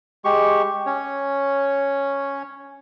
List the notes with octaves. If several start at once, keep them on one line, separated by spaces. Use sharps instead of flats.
G#3 G4 C#6
C#4 C#5